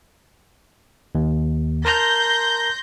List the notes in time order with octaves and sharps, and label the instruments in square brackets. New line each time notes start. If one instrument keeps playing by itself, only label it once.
[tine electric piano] D#2
[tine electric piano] A#4 A5 A#5 [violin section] C6 G6 A#6